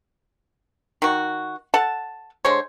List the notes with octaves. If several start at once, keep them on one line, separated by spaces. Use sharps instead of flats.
D#3 F#4
A4 F#5 A5
D3 G#3 C5 C#5